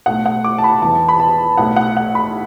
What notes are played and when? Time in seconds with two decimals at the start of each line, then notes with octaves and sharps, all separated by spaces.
0.06 B1 A2 A3 F#5
0.26 F#5
0.44 D6
0.58 A5
0.64 B5
0.82 E2 E3 B3 A5
1.09 B5
1.20 A5
1.57 B1 A2 A3 F#5
1.76 F#5
1.97 F#5
2.15 B5